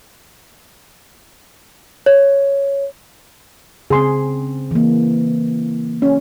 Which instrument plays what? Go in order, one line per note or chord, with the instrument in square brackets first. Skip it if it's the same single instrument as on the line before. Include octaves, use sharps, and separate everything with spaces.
[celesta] C#5
[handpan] C#3 C4 [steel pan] G#4 C6
[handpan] E3 A#3
[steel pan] C#4